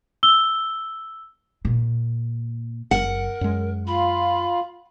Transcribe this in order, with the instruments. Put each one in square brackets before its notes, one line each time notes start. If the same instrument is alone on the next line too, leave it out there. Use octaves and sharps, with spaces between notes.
[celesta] E6 G7
[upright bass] A#2
[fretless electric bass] F#1 [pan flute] A#4 [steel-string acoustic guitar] F#5
[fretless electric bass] F#2 G#3
[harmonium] F4 [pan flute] B5